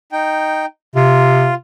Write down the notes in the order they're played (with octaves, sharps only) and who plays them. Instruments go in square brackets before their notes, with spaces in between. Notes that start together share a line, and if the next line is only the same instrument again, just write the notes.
[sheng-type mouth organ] D#4 G5
[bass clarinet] C3 [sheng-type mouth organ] F4